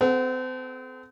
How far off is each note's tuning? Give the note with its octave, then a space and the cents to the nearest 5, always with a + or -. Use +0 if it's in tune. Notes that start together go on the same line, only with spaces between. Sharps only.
C4 -35 A4 -25 F#5 +0